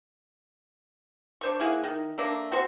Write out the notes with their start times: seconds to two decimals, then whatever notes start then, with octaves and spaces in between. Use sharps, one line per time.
1.41 D4 C5 C#6
1.60 A#3 E4 G#4 F#5
1.84 D#3
2.18 A3 A#3 D4
2.51 C4 F#4 C5 C#6